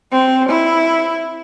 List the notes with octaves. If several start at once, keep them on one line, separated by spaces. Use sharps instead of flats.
C4
E4